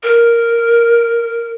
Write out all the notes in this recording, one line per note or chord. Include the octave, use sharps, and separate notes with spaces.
A#4